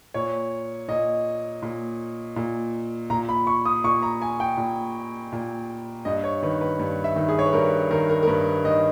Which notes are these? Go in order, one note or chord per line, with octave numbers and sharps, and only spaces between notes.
A#2 C#5
A#2 D#5
A#2
A#2
A#2 A#5
B5
C#6
D#6
A#2 C#6
A#5
G#5
G5
A#2
A#2
G2 D#5
C#5
D#3 B4
B4
G2
E5
D#3
G#4
C#5
B4
G2 A#4
D#3 A#4
A#4
A#4
G2 B4
D#3 D#5